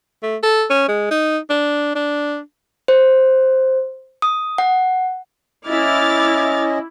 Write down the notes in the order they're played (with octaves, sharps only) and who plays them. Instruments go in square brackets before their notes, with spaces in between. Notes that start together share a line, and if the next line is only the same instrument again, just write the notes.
[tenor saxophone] A3
A4
C#4
G#3
D#4
D4
D4
[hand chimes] C5
D#6
F#5
[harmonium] C#4 D#5 [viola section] E4 [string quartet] D6 F6 A6